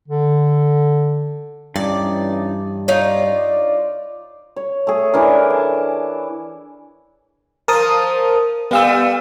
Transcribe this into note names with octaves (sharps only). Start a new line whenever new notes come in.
D3
G2 E3 C#4 D#4 D5
D#4 F4 C#5 D5
C#5
A3 G#4
E3 D4 A#4
A5
F3 A#4 C5 A5 D#6
G3 A3 B3 F5 E6